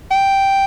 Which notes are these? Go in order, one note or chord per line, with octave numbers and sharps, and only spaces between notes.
G5